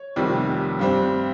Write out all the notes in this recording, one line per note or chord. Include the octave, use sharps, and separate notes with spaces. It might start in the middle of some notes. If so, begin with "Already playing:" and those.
Already playing: C#5
F1 F2 C3 D#3 G3
G2 G3 C4